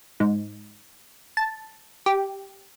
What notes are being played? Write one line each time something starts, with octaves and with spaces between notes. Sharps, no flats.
G#2
A5
G4